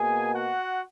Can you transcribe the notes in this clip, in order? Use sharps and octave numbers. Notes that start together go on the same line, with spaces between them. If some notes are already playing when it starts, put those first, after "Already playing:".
Already playing: B2 A#3 G#4 G#5
F#4 F#5